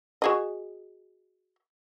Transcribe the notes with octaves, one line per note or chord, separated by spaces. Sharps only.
F#4 G#4 D#5